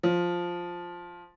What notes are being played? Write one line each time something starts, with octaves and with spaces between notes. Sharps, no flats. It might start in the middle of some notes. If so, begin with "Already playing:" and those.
F3